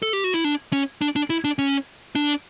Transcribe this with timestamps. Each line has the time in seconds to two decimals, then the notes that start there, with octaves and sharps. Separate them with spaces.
0.02 A4
0.13 G4
0.24 F#4
0.34 E4
0.44 D4
0.73 C#4
1.02 D4
1.16 D4
1.30 E4
1.44 D4
1.59 C#4
2.15 D4